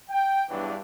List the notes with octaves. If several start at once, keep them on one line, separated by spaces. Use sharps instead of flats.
G5
E2 G2 E3 F#3 D4